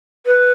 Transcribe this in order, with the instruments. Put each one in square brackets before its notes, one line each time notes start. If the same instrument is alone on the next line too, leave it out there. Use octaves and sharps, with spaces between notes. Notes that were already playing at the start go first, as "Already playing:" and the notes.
[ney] B4